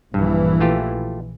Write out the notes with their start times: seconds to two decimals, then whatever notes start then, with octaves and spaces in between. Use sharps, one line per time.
0.14 A#1 G2 E3
0.61 A3 F4 G4